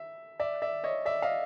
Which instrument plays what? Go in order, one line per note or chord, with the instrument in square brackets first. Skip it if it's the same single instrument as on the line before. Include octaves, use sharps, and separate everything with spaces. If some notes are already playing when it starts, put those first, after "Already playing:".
Already playing: [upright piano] E5
D5 E5
D5 E5
C#5 D#5
D5 E5
D#5 F5